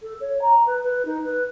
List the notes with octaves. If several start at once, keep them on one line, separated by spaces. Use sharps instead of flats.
A4
C#5
A#5
B4
B4
D#4
B4